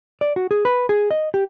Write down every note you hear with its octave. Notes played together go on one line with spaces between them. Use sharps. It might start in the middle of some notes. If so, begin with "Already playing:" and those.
D5
F#4
G#4
B4
G#4
D#5
G4